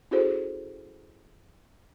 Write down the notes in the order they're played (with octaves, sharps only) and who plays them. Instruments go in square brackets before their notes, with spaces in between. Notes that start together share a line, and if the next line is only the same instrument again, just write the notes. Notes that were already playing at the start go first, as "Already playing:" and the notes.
[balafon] C#4 E4 F#4 G#4 A4 C5